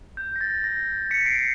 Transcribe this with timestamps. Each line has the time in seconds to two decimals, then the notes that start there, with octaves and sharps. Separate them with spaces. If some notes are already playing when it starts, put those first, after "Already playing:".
0.17 G6
0.36 A#6
0.41 A6
0.64 A#6
1.11 B6 C#7
1.26 C7 D7